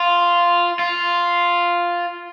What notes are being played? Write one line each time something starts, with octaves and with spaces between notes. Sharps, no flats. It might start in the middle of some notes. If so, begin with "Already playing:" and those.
Already playing: F4
F4